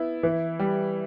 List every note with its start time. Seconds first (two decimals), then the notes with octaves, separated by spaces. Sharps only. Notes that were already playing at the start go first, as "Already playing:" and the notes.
Already playing: B3 E4
0.23 E3
0.59 G3